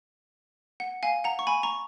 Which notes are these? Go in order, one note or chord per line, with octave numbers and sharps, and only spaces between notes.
F#5
F5 G#5
F#5 A#5
C#6
G#5 B5
A#5 C#6